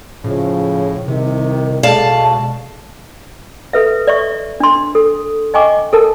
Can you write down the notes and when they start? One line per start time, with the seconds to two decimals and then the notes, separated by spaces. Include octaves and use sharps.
0.24 A2 C#3 F3
1.08 C2 C3 D#3
1.83 B2 G#3 A4 D5 F5 A5
3.73 A4 B4 E5
4.07 D5 E5 C#6
4.60 D4 C6
4.95 A4
5.54 D#5 G5 G#5 C#6 D6
5.93 A4 A#4 A5